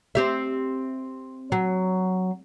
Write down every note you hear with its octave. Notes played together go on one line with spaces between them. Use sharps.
C4 G4 E5
F#3